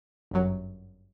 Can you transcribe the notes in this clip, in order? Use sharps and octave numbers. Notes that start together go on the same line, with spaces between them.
G1 F#2 F#3